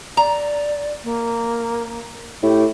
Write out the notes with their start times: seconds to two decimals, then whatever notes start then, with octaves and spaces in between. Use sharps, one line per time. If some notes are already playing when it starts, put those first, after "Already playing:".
0.17 D5 A#5
1.04 A#3
2.43 A2 G4